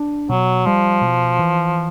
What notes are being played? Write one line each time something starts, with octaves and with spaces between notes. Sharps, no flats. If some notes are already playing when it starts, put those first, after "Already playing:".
Already playing: D4
B2 F#3
F3 G3
B2
E3